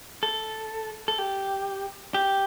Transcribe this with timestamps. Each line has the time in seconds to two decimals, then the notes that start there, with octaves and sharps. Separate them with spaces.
0.23 A4
1.08 A4
1.18 G4
2.14 G4